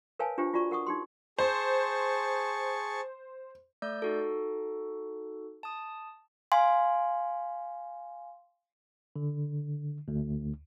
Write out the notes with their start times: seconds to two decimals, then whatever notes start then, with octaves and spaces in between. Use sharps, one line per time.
0.19 A#4 B4 C#5 F5 G#5 A5
0.38 D4 F4 G4 C5
0.53 F4 F#4 D5 A#5 C#6
0.71 A#4 F#5 C#6 D#6
0.87 D#4 G4 C6
1.39 G#4 C5 A5 C#6
3.82 A3 D5 E6 G6
4.02 D#4 F#4 A4
5.63 A5 D#6
6.52 F5 G#5 C6
9.16 D3
10.08 D2